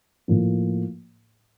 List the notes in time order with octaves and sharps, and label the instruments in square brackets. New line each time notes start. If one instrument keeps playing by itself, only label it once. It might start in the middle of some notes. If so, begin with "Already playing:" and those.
[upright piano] A2 F3 A#3